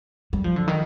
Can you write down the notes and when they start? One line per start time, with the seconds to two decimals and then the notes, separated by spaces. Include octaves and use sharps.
0.33 G3
0.44 F3
0.56 D3
0.68 D#3